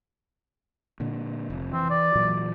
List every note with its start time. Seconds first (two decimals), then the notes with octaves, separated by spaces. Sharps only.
1.00 A#2 D3
1.50 F1
1.72 E3 C4
1.90 D5
2.15 A#2 E3 F#3